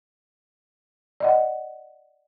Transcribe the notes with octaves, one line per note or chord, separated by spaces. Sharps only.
D5 D#5 F#5